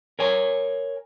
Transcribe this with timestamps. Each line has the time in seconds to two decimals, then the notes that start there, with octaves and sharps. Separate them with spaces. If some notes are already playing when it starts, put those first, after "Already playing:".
0.19 A#4 C#5 G#5